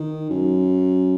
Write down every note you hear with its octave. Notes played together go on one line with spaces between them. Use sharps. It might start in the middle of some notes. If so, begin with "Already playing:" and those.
Already playing: D#3
F#2